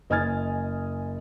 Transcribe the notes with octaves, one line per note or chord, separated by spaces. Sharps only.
F#1 D#5 G#5 F6 G#6 A6